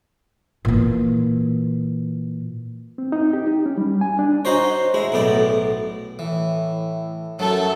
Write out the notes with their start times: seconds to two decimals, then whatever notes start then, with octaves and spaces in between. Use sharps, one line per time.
0.65 A#2 E3
2.98 C4
3.12 D#4
3.33 G4
3.47 D#4
3.66 C#4
3.78 G3
4.01 G#5
4.19 D4
4.45 D#4 F#4 C5 C#5
4.94 G#3 E4
5.12 B1 A2 B3 D5
6.19 A2 E3
7.39 F#2 F#3 A3 A4 A5